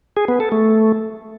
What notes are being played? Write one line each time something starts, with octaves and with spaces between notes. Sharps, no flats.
G#4
B3
A4
A3